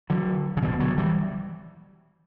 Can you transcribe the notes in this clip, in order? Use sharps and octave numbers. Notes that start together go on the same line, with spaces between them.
D3 F#3
C#3
B2 D3
D3 F#3
E3 G3